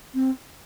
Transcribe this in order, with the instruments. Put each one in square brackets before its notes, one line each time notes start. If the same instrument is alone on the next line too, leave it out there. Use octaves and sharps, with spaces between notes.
[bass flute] C4